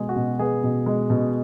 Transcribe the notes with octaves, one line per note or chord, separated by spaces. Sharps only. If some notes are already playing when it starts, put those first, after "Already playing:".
Already playing: B2 G#3 B3 G#4
F#4
B2
B3 G#4
B2
G#3
B2